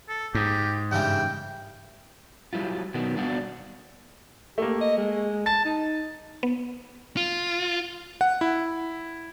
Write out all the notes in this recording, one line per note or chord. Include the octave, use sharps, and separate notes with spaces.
A4
G#2 G4
G2 C#3 E3 G5
F#3 G3 E4 F4
B2 D#3 F#3 B3
G3 B3 D4 F#4 D5 F5
A3 A#3 G4
D#5
G#3
A5 A6
D#4
B3
F4
F#5
E4